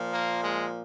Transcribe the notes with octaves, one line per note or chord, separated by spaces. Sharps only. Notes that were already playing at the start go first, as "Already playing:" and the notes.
Already playing: A#2 F3
A#3
G#3